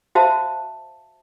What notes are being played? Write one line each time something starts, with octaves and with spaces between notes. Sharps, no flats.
F#4 C5 E5 F5 A5